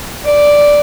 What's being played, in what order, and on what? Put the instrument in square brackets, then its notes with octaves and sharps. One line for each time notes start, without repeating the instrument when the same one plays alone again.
[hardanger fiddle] D5